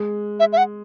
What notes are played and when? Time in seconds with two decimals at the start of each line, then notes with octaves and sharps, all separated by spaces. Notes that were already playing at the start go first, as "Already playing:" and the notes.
Already playing: G#3
0.40 E5
0.53 E5
0.57 F#5